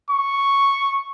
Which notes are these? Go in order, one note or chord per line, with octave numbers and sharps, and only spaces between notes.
C#6